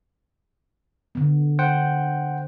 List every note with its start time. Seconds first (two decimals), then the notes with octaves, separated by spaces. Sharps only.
1.15 D3 B3
1.59 C5 F#5 G5